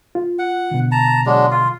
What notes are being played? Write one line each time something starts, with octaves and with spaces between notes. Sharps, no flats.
F4
F#5
B2 D3
A5 A#5
F#3 G#3 D4
F4